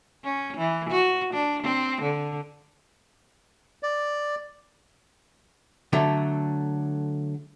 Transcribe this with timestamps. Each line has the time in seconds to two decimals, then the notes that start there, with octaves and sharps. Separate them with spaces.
0.24 C#4
0.57 E3
0.90 F#4
1.34 D4
1.62 C4
2.02 D3
3.83 D5
5.93 D3 F#3 A3